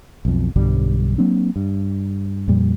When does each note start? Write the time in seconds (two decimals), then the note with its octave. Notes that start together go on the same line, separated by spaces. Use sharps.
0.25 B1 F2
0.56 B1 G2 D3 G3
1.18 F#3 A#3 C4 D4
1.56 G2
2.48 F2 A#2 G3